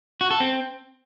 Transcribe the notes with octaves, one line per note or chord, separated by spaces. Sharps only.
F#4
A4
C4